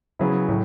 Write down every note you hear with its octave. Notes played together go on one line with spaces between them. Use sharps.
C#3 F#3 B3 E4 G#4
A2 F#3